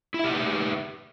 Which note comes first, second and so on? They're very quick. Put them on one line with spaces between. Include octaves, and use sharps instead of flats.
E4 E5 G4 D#4 B4